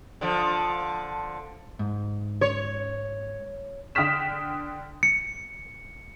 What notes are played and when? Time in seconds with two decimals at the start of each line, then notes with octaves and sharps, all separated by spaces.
0.21 D3 F3
1.79 G#2
2.41 C#5
3.95 D3 G5 D#6 F6 B6 E7
5.03 C#7